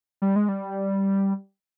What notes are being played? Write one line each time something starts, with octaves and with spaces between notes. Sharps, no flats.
G3
G#3
G3